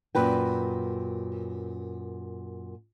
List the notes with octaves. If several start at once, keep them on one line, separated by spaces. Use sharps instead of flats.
F#2 A#2 B4 G5